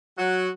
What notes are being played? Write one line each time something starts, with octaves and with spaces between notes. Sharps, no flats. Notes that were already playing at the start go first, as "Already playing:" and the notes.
F#3 F#4